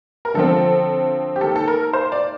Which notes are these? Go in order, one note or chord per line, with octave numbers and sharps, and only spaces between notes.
A#4
D3 F3 C4 A4
G4
D#3 A#3 A4
A4
A#4
C5
D5